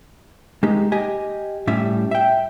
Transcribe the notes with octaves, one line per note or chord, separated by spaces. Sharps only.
G#3 A#3 D#4 G4
G4 D#5 G#5
A2 G3 C#4 E5
E5 G5